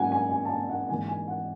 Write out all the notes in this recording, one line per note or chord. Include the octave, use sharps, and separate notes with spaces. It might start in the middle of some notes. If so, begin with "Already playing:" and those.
Already playing: G#2 F#3 C#4 F#5 G#5
G#5
G#5
A5
G#5
F#5
G#2 E3 B3 G#5
G#5
F#5